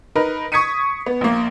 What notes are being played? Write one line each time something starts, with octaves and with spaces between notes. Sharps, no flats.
D#4 A#4 B4
C#6 D#6 G#6 B6 C#7 D#7
B3
A#1 A#3